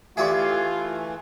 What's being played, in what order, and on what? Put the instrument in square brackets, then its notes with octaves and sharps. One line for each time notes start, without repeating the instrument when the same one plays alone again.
[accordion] E3 A3 [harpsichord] E4 G4 D5 [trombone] F4 [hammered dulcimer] G#4 C#5